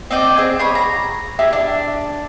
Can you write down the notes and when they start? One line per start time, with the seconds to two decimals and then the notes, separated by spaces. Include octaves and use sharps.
0.11 C4 D5 D#5 G5
0.38 C4 G#4
0.59 G#4 C#5 B5
0.75 A#5
1.39 E4 G4 G#4
1.53 D4